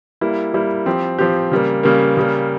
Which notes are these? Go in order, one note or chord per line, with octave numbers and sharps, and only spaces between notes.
G3 A#3 E4
G3 A#3 E4
F3 C4 G4
F3 C4 G4
C#3 G3 A#3
C#3 G3 A#3
C#3 G3 A#3